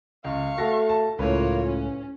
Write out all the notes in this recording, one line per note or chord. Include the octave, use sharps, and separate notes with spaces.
C#2 F5 C#6
A3 F#4 A4 A#6
A5
C#2 A2 A#3 F4 B4 C#5
C#4